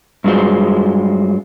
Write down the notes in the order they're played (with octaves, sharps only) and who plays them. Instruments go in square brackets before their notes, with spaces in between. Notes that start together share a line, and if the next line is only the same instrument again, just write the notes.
[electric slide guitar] G2 F#3 G#3 F4 C5